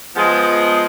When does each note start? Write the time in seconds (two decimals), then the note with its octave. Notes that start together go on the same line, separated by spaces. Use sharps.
0.16 F3 G#3 B3